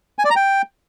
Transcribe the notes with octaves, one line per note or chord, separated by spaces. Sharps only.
G#5
D5
A#5
G5